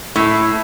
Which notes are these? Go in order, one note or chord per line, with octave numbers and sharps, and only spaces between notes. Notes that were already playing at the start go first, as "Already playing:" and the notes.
A2